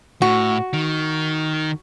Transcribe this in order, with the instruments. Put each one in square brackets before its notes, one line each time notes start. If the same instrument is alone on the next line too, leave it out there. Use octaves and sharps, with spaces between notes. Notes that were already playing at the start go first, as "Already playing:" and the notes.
[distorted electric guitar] A2 [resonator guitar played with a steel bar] F#4
[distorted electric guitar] D#3